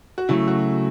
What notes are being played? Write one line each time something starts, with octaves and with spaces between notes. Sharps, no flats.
F#4
C#3 F#3 A3 E4
F#4